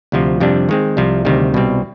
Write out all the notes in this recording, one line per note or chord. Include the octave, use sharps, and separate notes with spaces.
D2 C3 F3
F2 C3 G3 D4
D#3 G#3 C4
C2 C3 F3
D2 C3 D#3 G3
C2 B2 G3 C4